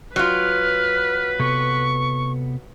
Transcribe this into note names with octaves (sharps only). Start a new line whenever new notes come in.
F#3 F4 B4 F6
C3 B3 A4 C#6